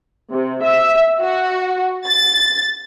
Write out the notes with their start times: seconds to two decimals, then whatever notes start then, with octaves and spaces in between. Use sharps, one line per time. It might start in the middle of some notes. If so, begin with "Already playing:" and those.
0.32 C3
0.65 E5
1.20 F#4
2.07 A6